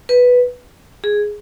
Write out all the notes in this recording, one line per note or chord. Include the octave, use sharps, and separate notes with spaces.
B4
G#4